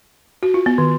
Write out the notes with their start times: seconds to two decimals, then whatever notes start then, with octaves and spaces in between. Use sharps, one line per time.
0.43 F#4
0.54 F4
0.66 B3
0.78 D#3